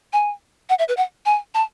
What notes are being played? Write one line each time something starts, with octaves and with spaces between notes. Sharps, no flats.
G#5
F#5
E5
B4
F#5
G#5
A5